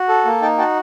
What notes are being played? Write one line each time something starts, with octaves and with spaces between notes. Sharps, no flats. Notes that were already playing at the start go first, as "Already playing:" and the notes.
Already playing: F#4
A4
A#3
D#4 G5 A5
F#4 G5 A5